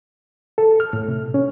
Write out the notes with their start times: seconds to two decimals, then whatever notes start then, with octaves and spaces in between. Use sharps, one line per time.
0.58 A4
0.80 F6
0.93 A2
1.08 C3
1.34 C#4